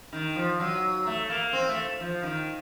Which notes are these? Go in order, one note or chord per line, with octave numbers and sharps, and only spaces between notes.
D#3
F3
F#3
A3
A#3
C4
A3
F3
D#3